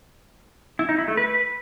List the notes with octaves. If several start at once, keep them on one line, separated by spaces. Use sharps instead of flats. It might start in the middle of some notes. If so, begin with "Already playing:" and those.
E4
D#4
E4
A3
B4